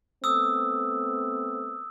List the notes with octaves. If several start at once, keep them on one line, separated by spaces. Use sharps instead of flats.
A3 B3 C4 D#6 E6